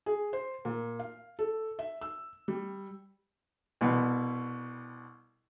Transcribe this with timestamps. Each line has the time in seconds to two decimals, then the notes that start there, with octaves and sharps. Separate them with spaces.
0.06 G#4
0.33 C5
0.65 A#2
0.99 F5
1.39 A4
1.79 E5
2.01 E6
2.48 G3
3.81 C2 B2